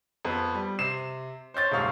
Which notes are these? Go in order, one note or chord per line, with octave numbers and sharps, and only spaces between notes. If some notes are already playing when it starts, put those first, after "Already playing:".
F2 B3
G3
C3 C7 E7
C5 C#5 G6 A6
D#1 G#2 C3 F5 C#6 F6